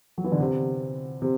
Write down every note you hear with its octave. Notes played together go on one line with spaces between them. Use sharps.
F#3
E3
D3
C3
C3